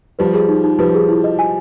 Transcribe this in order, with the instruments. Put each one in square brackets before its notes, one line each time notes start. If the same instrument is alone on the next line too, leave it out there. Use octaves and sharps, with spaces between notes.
[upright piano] F3 G3 [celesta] B4
[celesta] G#4
D#4
D#4
[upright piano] F3 G3 [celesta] B4
[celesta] G#4
E4
D#5
G#5